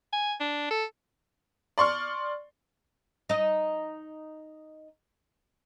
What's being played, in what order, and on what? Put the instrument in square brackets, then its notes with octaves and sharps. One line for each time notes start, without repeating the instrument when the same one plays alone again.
[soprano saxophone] G#5
D4
A4
[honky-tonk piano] D5 C6 C#6 F6
[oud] D#4 D#5